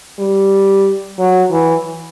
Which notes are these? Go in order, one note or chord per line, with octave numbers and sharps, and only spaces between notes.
G3
F#3
E3